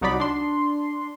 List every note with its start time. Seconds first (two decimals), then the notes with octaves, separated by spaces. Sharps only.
0.01 C2 F#3 D#4 F#4 D5 B5
0.20 D4 C6